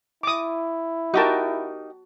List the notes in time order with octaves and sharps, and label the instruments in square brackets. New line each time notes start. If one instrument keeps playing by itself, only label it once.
[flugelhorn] E4 [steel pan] D6 D#6
[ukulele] D#4 G4 A#4 [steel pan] F#4 A5